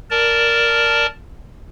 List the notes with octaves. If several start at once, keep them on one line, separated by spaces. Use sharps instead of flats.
A#4 D5 A5